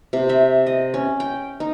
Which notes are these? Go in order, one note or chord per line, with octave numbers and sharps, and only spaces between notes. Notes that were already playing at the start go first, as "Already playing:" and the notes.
C3
E5
D#5
C#4
G5
D#4